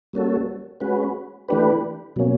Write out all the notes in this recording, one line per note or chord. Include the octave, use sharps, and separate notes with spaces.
G3 A#3 C#4 F#4 A4
G#3 C#4 F#4 B4
E3 A3 D4 G4 B4
B2 F#3 A#3 C#4